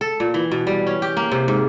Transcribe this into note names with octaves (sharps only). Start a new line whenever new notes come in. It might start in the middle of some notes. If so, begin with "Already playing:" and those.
A4
A#2
E3
B2
G3
C#4
G4
A#3
C3
G#2